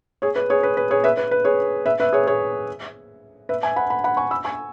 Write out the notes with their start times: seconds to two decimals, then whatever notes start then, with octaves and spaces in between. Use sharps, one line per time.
0.22 G#4 C#5
0.36 B4
0.50 G#4 C#5
0.63 B4
0.77 B4
0.91 G#4 C#5
1.04 B4 E5
1.17 B4
1.31 B4
1.45 G#4 C#5
1.86 B4 E5
2.00 B4 E5
2.13 G#4 C#5
2.27 G#4 C#5
3.49 B4 E5
3.63 E5 G#5
3.76 F#5 B5
3.90 F#5 B5
4.04 F#5 B5
4.17 G#5 C#6
4.31 B5 E6
4.45 G#5 C#6